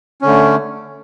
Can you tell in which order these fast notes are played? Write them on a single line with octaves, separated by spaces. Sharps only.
C#4 D3 A3